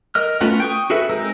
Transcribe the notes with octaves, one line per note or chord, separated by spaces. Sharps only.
A#4 D#5 F6
A3 B3 C#4 F4 F#4
G5 C#6 D#6
F#4 G#4 A4 B4 E5
G#3 C4 D#4 A#4 E6